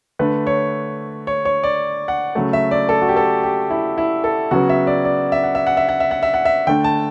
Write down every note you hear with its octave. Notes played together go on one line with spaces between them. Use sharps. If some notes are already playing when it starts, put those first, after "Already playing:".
D3 A3 B4
C#5
C#5
C#5
D5
F#5
C#3 F#3 A3
E5
D5
A4
F#4
G4
A4
G4
E4
E4
A4
C#3 F#3 B3 F#4
E5
D5
D5
E5
F#5
E5
F#5
E5
F#5
E5
F#5
E5
F#5
E5
D3 A3 G5
A5